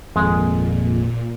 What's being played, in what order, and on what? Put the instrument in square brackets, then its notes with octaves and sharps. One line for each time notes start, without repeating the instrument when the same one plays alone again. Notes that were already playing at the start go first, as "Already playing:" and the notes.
[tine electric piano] G#1 F2 [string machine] A#2 [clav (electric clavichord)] G#3